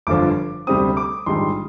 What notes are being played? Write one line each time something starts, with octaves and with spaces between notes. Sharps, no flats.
G1 G2 D3 F3 D6
D2 C3 G3 C4 D#6
D6
A#1 G#2 D#3 G3 C6